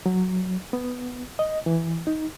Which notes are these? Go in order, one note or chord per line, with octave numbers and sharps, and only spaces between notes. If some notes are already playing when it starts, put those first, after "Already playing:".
F#3
B3
D#5
E3
D#4